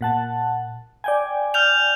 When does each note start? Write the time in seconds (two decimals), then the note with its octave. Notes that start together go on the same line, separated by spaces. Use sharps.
0.01 A#2 F#5 A5
1.04 D5 G5 G#5
1.54 F6 G6 F7